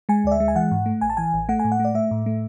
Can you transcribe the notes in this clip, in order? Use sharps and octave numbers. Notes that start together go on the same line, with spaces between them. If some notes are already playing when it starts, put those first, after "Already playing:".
G#3 G#5
D2 D5
E5
G#3
G#5
E3 F#5
G#2
A3
A1 G#5
A5
E3 G#5
A1
A3 F#5
G#5
A2
F#5
A3
D5
A3 E5
A2
A3